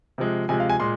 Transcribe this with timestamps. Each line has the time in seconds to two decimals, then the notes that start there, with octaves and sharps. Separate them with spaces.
0.18 C3 F3 G#3
0.49 C3 F3 G#3 G#5
0.60 F5
0.70 G#5
0.80 A#2 G#3 C6